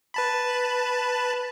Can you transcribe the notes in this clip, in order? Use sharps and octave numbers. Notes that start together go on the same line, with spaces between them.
B4 A5 B5